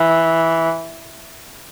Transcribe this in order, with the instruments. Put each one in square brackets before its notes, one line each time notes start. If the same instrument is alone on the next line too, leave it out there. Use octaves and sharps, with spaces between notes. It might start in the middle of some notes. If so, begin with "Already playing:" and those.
Already playing: [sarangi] E3